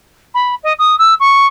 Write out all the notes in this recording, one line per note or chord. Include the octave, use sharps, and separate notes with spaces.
B5
D#5
D#6
E6
C#6